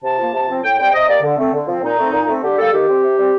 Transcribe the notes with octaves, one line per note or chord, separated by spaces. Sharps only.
C3 A5
F3 A#3
C3
F3 C4
A2 G5
G3 C4 G5
C3 D#5
G3 A#3 D5
D3
A3 C4
D3
F3 C4
A#2 D#4
A3 C4
A#2
A3 C4
D3 G4
G3 A#3 A4
D#3 G4
G3 C4
C3
G3 C4